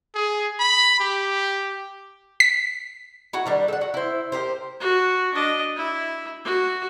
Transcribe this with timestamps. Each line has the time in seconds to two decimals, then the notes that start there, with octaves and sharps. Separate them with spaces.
0.15 G#4
0.60 B5
1.00 G4
2.40 B6
3.33 E4 F#4 F#5
3.46 D#3 G3 D4
3.68 A4 F#5
3.81 F#4
3.94 E4 C5
4.32 G4 A#4 C5
4.80 F#4
5.34 D4 D#5
5.76 E4
6.44 F#4